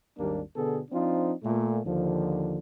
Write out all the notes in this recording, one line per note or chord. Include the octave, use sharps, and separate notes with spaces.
G#1 D#2 G3 A#3 D4
B2 D3 B3 G#4 A4
F3 C4 D4 D#4 F4
A#2 A3
D#2 D3 F3